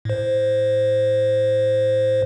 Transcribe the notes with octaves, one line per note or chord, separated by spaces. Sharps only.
A2 C5